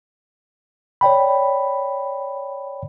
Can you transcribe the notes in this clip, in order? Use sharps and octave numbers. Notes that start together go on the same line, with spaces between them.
C#5 D5 G5 B5